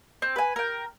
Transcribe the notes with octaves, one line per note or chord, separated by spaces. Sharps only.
C4
B4 G#5
A#4 G5